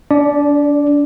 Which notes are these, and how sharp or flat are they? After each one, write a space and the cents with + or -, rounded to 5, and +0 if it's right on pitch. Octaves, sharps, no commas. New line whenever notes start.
D4 -30 D5 +0